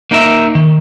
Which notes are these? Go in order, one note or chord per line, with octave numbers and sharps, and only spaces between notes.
A#3 D#4 A#4 E5
D#3